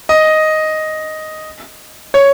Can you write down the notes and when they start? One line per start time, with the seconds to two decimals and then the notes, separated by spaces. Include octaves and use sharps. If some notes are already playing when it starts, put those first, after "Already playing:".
0.09 D#5
2.14 C#5